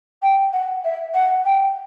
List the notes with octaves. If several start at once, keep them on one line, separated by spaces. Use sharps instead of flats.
G5
F#5
E5
F#5
G5